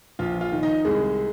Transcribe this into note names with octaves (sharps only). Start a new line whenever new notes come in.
A#1 F4 F5
F4 F5
D#3
D#4 D#5
C2 G#3 G#4